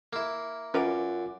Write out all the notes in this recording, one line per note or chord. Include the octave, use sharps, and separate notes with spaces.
A#3 E4
F#2 C#4 F4 A#4 B4 F#5 D6